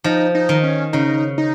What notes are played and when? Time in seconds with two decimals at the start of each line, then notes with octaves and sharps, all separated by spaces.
0.04 F3 D#4
0.35 D#4
0.49 D#3
0.63 C#4
0.93 C#3 D#4
1.38 D#4